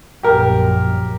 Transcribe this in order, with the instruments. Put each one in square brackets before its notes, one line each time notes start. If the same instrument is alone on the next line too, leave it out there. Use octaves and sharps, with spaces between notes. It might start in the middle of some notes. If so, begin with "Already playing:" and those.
[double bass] A#1 F#2 [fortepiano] G4 A#4